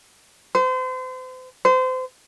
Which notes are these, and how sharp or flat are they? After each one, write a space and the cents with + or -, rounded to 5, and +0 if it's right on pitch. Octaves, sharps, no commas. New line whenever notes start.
C5 -35
C5 -30